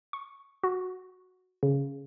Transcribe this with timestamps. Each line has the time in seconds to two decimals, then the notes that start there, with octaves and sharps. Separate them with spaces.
0.13 C#6
0.63 F#4
1.63 C#3